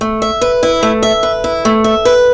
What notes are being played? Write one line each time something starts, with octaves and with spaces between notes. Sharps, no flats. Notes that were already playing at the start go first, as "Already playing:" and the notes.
A3
E5
B4
E4
A3
E5
B4
E4
A3
E5
B4